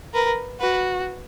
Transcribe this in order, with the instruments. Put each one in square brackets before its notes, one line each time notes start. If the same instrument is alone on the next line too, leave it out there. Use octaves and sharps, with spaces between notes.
[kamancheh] A#4 [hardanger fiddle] B4
[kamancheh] F#4 [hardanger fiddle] B4